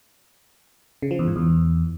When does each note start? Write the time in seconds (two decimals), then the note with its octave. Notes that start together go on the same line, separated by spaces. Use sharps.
1.02 C#3
1.11 F3
1.19 E2
1.27 G#2
1.36 E2